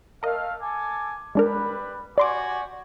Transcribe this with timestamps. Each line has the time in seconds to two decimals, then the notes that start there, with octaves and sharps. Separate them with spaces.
0.23 A3 A#4 D#5 F5
0.60 A4 G#5 D6
1.35 G3 G#3 D4 A#4 B4
2.18 F#4 G4 D5 G#5 C6 D6